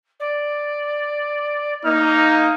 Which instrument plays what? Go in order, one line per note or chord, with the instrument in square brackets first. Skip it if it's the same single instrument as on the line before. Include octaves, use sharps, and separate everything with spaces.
[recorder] D5
[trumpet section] A#3 D#4 [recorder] F6